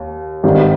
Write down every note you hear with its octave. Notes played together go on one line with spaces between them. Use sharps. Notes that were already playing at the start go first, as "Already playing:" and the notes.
Already playing: D#2
G#1 G2 D#3 G3